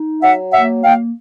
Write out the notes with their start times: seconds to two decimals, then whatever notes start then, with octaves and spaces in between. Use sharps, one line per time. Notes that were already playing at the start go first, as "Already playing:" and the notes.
Already playing: D#4
0.22 F#3 E5 F#5
0.52 A#3 E5 F#5
0.83 A#3 F5 G5